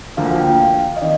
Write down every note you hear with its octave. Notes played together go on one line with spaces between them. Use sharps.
D2 D3 F3 A#3 F4 F5
G5
F5
F5
D#5
D#3 D5